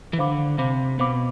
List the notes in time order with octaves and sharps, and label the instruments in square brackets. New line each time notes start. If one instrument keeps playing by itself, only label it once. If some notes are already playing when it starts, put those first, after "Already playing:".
[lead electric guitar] E3
[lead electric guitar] D3 [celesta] C5 F5 B5 D6
[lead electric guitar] C3 [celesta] C5 F5 B5 D6
[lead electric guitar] B2 [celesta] C5 F5 B5 D6